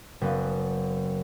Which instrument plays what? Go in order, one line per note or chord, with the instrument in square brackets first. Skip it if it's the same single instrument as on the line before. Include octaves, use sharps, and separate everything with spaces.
[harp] F#1 B3